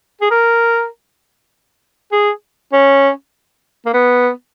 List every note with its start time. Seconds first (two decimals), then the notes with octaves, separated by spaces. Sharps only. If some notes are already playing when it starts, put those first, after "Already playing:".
0.21 G#4
0.31 A#4
2.12 G#4
2.73 C#4
3.86 A#3
3.94 B3